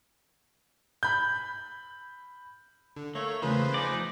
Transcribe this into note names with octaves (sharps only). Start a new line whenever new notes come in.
B5 G6
D3
A3 A#3 C#5
E2 C#3 F3 A3 G#4 B4 C5
D#4 D5 F5 G#5